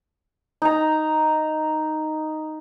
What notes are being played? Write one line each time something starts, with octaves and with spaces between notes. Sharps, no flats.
D#4 A#5